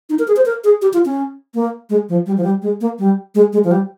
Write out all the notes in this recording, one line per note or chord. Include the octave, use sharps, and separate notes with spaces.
D#4
A#4
G#4
C5
A#4
G#4
G4
F4
C#4
A#3
G#3
F3
G3
F3
G3
G#3
A#3
G3
G#3
G#3
F3
G3